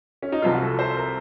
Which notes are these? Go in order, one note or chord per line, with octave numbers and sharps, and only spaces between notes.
C#4
D#4
C2 C3 F3 F4
F#4
A4
C5
A#4